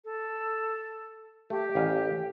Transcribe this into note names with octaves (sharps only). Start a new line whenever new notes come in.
A4
A3 G4
A1 F5 G#5